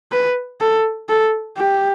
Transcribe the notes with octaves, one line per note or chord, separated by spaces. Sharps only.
B4
A4
A4
G4